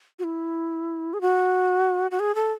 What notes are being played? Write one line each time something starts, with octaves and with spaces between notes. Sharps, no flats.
F#4
E4
G#4
F#4
F#4
G#4
A4